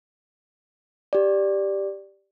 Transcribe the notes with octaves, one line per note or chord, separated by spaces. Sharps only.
G4 D5